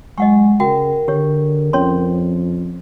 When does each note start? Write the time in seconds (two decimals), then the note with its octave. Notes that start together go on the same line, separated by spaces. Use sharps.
0.18 F#3 G#3 D#5 F#5 C#6
0.60 C#3 F#4 A#4 G5
1.08 D3 G4 C#5
1.73 F2 C#4 C#5 C6